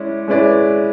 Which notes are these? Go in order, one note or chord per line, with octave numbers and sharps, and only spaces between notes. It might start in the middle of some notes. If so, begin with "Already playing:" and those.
Already playing: G#3 C#4 E4 D5
G#3 C#4 E4 B4 D5